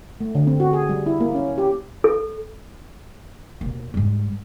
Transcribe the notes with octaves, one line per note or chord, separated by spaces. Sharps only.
A3
D3
C4
F#4
G#4
G3
E4
A#3
C#4
G4
A4
D#2 B2
G#2 G3